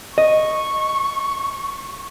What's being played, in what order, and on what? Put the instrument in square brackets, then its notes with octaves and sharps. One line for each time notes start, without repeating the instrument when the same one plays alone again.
[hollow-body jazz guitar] D#5 [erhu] C#6